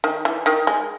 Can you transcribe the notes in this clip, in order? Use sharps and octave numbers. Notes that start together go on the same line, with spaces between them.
D#3
E3
D#3
G#3